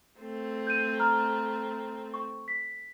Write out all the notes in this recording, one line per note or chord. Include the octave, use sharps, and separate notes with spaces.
A3 C4
G6 D#7
A#5 F6
C#6
B6